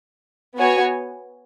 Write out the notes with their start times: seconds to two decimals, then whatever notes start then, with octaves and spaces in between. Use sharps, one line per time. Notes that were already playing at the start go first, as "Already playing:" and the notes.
0.57 B3 F#4 C#5 G#5